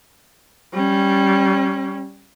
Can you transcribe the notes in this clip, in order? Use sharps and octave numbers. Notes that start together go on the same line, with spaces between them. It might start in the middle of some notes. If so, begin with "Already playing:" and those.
G3 C#4